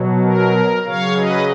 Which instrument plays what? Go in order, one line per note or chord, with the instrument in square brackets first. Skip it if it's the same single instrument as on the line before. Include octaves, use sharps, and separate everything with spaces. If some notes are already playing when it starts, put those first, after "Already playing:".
Already playing: [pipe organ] B2 F#3
A#4
C#3 F#3 C#5 F5
B4 D#5